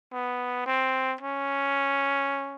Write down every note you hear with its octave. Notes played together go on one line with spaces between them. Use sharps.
B3
C4
C#4